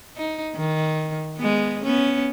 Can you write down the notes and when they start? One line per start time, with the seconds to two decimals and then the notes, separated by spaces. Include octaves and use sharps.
0.16 D#4
0.56 D#3
1.37 G#3 B3
1.83 B3 C#4